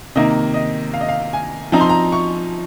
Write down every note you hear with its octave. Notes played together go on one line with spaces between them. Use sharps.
C3 D#3 A#3 D#5
D#5
F5
D#5
F5
G#5
F3 C4 D#4 A#5
C6
A#5
C#6